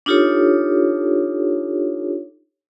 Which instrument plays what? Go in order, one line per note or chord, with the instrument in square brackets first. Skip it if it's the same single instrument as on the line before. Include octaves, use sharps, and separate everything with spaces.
[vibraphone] D4 D#4 F4 G4 A4 C#5